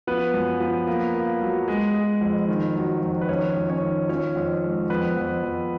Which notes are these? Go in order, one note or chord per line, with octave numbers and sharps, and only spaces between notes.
F3 B3 B4
F#2
F3
A#3
A#3
F#3
G#3
G#3
F2
D#3
F#3
F2
B4
D#3 C#4 C#5
F2
C#4 C#5
D#3
F3 C#4 C#5
F2
G#3
F2 B3 B4
F2
F2